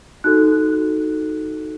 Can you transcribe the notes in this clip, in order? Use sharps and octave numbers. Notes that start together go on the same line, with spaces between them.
D#4 F#4 A4 F#6